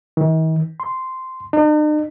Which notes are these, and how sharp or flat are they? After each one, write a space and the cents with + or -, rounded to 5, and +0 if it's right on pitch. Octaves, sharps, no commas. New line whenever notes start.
D#3 +45
C6 -10
D#4 -45